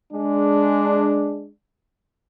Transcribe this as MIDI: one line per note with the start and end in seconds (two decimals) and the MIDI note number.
0.14 1.52 56
0.14 1.52 62